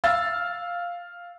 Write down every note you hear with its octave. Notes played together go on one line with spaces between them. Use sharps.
F5 E6 A6